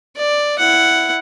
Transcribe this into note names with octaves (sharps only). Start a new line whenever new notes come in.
D5
E4 F#5